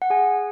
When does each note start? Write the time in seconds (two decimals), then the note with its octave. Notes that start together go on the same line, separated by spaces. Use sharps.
0.02 F#5
0.10 G#4 G#5